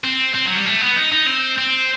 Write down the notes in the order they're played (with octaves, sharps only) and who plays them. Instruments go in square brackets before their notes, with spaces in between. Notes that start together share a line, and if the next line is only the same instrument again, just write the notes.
[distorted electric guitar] C4
C4
F#3
G3
A3
B3
D#4
D#4
C4
C4